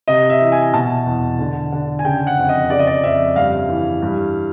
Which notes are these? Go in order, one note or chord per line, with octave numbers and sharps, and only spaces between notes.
C3 D#5
E5
E3
G#5
B2 A5
E2
D3
D3
G#5
C#3 G5
F#5
F2
D#5
C#3 D5
D#5
D5
F2 E5
G2 F5
E3
G2